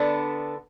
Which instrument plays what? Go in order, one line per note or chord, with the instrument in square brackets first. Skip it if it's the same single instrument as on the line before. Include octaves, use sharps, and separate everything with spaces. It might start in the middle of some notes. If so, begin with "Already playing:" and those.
Already playing: [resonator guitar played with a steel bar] D3 B3 D4 A4